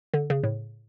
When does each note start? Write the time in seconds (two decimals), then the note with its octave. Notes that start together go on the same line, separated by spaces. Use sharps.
0.14 D3
0.30 C#3
0.44 A2